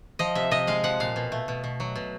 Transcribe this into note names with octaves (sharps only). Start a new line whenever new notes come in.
F3 D#5
C3 E5
C3 D#5
G#3 F5
F3 F#5
A#2 F5
B2
A3
B2
B2
F#3
B2